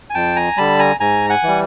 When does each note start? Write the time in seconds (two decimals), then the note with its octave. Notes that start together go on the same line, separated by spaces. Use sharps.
0.10 G#5
0.14 F2 G5 A5
0.36 G#5 A#5
0.57 D3 G3 A5 B5
0.79 G#5 A#5
1.00 G#2 G#5 A#5
1.29 F#5 G#5
1.43 E3 G3